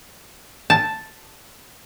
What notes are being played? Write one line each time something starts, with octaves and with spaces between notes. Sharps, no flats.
A5